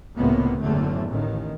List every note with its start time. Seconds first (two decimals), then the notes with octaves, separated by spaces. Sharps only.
0.17 C#2 A2 C3 A#3 B3
0.60 F#1 E2 A2 D3 A3
1.08 A1 D#3